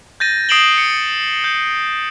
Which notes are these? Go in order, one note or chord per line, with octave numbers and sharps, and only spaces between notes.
G6 A6 A#6 D#7
D#6 C7 D7 E7 F#7 G7
C#7
G6